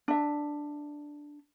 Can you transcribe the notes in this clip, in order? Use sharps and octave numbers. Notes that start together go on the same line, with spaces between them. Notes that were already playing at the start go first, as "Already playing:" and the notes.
D4 E5